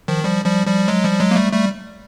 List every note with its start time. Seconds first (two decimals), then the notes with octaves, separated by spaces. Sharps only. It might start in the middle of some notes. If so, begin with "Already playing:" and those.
0.08 D#3 F3
0.24 F3 G3
0.45 F3 G3
0.67 F3 G3
0.88 F#3 G#3
1.04 F3 G3
1.20 F#3 G#3
1.31 A#3
1.36 G3 A3
1.53 G3 A3